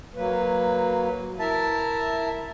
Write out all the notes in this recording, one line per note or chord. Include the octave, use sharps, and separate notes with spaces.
F#3 A#3 B4
E4 A#4 E5 A5